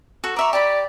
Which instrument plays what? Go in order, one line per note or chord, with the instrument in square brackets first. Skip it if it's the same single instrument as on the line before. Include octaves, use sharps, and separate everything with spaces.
[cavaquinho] F#4 A4
[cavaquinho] D5 E5 C#6 [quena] A#5
[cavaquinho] G4 B5 [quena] D5